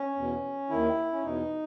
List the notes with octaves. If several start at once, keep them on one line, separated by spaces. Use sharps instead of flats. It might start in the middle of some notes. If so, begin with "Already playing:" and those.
Already playing: C#4
E2 B2
D#2 D#3 E4
C#4
E2 B2 D#4